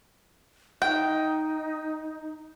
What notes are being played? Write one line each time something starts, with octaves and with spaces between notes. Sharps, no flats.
D#4 G5